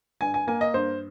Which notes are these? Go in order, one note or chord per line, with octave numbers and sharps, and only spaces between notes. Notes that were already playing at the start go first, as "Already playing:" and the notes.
G2 G#5
G#5
A#3 G#5
D#5
G2 C5